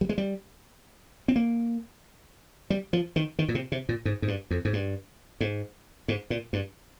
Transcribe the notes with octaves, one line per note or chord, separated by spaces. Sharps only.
G3
G#3
G3
C4
A#3
G3
F3
D#3
D#3
A#2
C3
C3
A#2
G#2
G#2
G2
F2
G#2
G2
G#2
G#2
A#2
G2